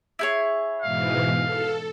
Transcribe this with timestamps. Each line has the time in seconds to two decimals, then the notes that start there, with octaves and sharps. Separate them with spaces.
0.19 E4 G#4 C#5
0.82 G#2 B2 E3 F5
1.42 A4